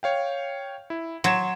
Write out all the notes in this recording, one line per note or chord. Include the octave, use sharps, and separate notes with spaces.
C#5 F5 G5
E4
F#3 C6 G#6 E7